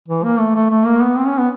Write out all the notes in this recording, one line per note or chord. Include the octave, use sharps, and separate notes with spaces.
E3
A#3
A3
A3
A3
A#3
B3
C4
C#4
B3